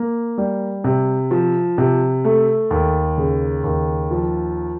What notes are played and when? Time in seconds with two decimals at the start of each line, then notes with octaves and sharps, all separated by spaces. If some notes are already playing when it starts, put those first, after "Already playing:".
Already playing: A#3
0.38 G3
0.84 C3
1.31 F3
1.78 C3
2.25 A3
2.71 D#2
3.18 C#3
3.64 D#2
4.11 F3